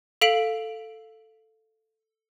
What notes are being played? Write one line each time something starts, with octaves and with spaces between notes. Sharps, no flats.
A4 F5 B6 D7 F7 F#7